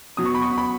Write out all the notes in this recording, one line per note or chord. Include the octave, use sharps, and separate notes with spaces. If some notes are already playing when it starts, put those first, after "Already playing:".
B2 F#3 D#6
C#6
B5
C#6
B5